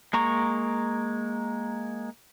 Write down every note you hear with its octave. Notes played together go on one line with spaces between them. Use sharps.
G#3 A#3 A#5 C#6